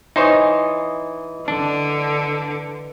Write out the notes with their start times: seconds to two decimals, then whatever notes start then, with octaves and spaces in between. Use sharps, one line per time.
0.16 E3 D#4 C5 C#5 D#5
1.48 D3 D4